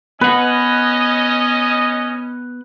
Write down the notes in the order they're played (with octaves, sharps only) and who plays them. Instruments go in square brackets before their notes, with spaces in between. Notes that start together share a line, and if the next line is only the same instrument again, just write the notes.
[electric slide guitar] B3 F#5 [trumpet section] C#4 D#5 [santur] B4